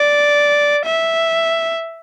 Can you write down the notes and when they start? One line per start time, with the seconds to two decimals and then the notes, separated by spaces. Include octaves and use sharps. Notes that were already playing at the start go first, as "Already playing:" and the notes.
Already playing: D5
0.86 E5